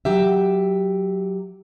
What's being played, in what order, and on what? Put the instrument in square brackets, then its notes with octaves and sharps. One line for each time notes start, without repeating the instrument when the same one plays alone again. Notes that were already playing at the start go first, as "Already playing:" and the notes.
[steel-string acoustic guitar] F#3 G4 E5